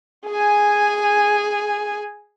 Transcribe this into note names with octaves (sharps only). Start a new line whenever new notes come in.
G#4 G#5